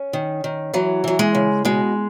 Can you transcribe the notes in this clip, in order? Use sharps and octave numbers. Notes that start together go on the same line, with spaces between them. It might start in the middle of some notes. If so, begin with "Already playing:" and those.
Already playing: C#4
D#3
D#3
E3 F#3
E3 F#3
G#3
C#3
B2 G#3